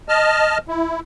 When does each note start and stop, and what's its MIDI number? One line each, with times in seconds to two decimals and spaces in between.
0.09 0.58 75
0.09 0.58 81
0.09 0.58 89
0.68 1.00 64